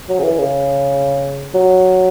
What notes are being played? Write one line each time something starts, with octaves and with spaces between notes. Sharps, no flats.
F#3
C#3
E3
C#3
F#3